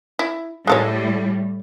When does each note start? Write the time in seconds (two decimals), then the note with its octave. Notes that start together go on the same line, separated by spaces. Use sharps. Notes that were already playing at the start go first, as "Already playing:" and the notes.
0.19 E4
0.67 A2 G3 G#3 A4 C#5